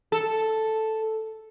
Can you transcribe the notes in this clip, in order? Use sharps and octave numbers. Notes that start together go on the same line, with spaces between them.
A4